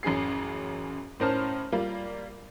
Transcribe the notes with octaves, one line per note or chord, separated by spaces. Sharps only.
A1 F#2 G#4 C7
A2 C#4 A#4 C5 A5 F6
G3 A#3 F4